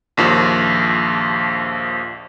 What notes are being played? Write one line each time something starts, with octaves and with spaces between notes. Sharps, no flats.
A#1 D#2 F3